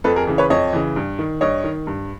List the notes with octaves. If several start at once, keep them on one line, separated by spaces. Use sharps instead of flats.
F2 A4 B4
G#4 A#4
C#3 E3
B4 C#5
F2 C#5 D#5
C#3 E3
G2
D#3
G2 C#5 D#5
D#3
G2